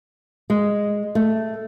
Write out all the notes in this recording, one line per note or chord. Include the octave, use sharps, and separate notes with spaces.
G#3
A3